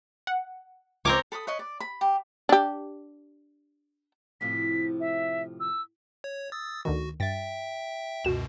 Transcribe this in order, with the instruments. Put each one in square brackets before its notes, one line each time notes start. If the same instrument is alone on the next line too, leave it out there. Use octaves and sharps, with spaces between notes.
[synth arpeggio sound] F#5
[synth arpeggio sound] C#2 D6 [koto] C4 A#4 C#5
[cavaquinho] A4 B5 C#6 D#6
B4 C#5 D#5
D5
B5
G4
[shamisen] D4 G4
[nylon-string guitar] A2 C3 F3 [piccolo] B6
[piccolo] E5
E6
[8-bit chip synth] C#5
D#6 E6 A6
[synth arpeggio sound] D2 D3 D#3 [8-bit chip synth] F#4
[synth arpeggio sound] G2 A6 [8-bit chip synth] E5 G5
[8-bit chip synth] C#2 F#2 B2 [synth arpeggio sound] F#4 E7